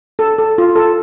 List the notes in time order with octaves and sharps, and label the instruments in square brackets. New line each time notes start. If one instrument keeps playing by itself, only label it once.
[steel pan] A4
A4
F4
A4